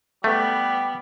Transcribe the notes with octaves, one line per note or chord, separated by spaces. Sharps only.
G3 A3 B3